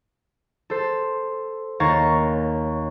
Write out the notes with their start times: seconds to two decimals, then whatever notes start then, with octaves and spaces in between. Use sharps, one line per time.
0.70 A4 C5
1.80 D#2 A#3 C#5 A#5 C#6 A6